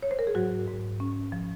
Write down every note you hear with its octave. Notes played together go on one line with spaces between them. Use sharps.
C#5
C5
A#4
G#4
G#2 F#3 F#4
G#2
C#4
F3